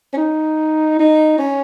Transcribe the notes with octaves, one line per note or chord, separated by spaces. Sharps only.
C#4
D#4
D#4
C#4